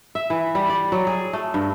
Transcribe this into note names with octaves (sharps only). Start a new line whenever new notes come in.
E5
E3
G3
D5
F#3
G#4
A3
G2